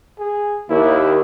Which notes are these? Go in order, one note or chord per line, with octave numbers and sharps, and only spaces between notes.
G#4
D#2 E4